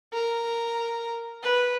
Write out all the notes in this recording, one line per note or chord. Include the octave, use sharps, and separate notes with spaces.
A#4
B4